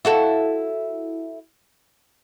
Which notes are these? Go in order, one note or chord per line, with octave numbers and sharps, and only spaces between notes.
E4 F#4 A4